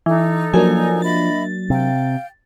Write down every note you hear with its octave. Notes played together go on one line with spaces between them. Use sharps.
E3 D#4 A4
F3 F#3 A#3 D4 G#5
D#5 E5 B5 A6
C3 F5 G5